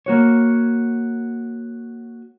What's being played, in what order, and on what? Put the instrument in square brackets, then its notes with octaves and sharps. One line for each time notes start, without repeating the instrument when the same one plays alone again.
[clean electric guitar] A#3 F#4 C#5